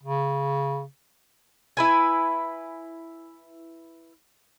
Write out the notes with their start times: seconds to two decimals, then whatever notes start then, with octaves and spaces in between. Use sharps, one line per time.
0.03 C#3
1.77 E4 B4 G#5